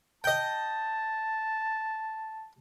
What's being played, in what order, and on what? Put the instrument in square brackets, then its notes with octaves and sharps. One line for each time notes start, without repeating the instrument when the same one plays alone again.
[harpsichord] D#5 G5 [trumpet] A5